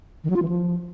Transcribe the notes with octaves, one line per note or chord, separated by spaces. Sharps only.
D#3
F#3
F4
E3
F3